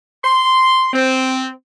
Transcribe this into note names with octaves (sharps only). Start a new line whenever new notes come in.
C6
C4